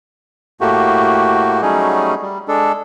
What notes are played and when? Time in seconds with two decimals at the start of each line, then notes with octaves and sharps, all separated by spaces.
0.61 A2 A3 A#3 F#4 G4
1.62 F#3 G3 A3 C#4 D#4 G#4
2.22 G3
2.48 G#3 D4 A4